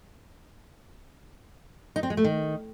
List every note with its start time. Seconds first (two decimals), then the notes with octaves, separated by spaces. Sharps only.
1.96 D#4
2.03 C4
2.10 G#3
2.17 A3
2.24 D#3